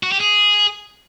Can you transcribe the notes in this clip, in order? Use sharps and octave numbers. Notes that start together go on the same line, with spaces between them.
F#4
G4
G#4